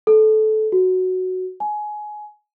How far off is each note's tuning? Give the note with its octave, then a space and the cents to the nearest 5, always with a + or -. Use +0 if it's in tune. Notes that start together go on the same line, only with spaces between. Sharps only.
A4 -20
F#4 +0
G#5 +20